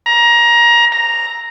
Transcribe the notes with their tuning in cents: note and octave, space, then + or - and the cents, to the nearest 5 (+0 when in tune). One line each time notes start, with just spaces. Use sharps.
A#5 +20
A#5 +0